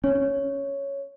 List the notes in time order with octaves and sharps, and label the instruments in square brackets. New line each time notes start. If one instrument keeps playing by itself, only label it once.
[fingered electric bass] C#4 [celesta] C#5